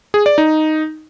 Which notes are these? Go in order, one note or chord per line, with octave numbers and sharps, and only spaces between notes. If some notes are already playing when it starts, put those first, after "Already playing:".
G#4
D5
D#4